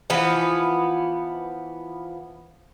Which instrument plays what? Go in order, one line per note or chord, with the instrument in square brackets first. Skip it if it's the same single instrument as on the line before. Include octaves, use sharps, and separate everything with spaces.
[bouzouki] E3 F3 B3 B4